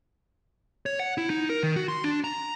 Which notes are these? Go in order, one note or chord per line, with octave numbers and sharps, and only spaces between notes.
C#5
F#5
E4
D#4
A#4
D#3
F#4
C6
D4
A#5